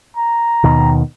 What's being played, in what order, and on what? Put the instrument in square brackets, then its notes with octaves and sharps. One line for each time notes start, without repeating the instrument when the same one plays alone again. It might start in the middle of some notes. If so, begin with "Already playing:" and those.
[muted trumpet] A#5
[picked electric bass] D#2 B2 D#3